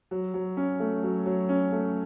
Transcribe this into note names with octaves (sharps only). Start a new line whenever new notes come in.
F#3
F#3
C#4
A3
F#3
F#3
C#4
A3